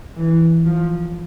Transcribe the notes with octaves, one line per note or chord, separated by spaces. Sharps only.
E3
F3